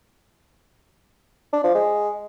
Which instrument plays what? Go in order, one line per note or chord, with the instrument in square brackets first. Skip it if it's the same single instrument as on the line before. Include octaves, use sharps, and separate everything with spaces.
[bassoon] D4
F3
G#3